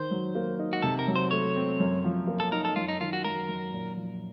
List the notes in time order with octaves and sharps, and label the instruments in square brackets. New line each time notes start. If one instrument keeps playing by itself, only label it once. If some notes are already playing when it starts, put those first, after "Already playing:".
Already playing: [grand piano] D#3 [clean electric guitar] C5
[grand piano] F#3
A#3
D#4
[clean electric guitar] F#4
[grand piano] C3 [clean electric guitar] A4
[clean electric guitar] A#4
[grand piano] F#3
[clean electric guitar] C5
[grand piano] A3 [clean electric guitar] C#5
[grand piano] C4
F#2
F3
A#3
[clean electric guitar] A4
[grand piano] D#4 [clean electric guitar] A#4
[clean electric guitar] A4
[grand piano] F#2 [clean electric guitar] F4
[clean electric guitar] D#4
[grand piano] D#3 [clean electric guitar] F4
[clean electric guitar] F#4
[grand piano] F#3 [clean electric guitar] A#4
[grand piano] F#2
A#2
F3